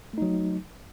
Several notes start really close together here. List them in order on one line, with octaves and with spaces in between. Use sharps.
A3 D#4 F#3